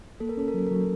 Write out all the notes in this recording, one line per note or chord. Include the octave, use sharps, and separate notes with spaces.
A#3 A4
A#4
C#4 A4
A#4
F#3 A4
A#4
F#3 A4